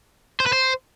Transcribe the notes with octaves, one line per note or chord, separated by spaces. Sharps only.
C5
B4
C5